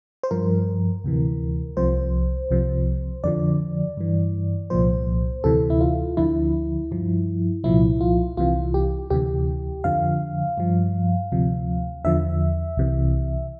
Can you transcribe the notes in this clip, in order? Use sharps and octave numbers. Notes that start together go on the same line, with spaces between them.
C5
G2 F3 A#4
D2 C3 E3
C2 C3 F3 C5
C2 C3 F3
F2 D3 F3 D5
G2 E3
C2 A#2 F3 C5
D2 C3 E3 A4
E4
F4
D2 D3 F3 E4
G2 F3
C2 A#2 F3 E4
F4
C2 C3 E3 F4
G4
D2 C3 E3 G4
F2 D3 F3 F5
G2 F3
D2 C3 F3
E2 D3 F3 E5
C2 C3 E3